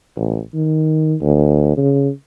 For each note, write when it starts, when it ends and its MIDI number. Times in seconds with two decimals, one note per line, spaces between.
0.16 0.39 33
0.54 1.15 51
1.21 1.76 38
1.77 2.09 49